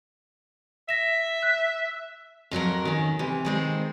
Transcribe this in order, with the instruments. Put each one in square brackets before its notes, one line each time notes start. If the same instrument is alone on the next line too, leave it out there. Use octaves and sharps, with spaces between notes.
[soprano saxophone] E5 [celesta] A#6 E7
[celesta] F#6
[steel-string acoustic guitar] F2 F#3 F#4 A#4
D#3 C#4
C3 E3
D#3 G#3 C4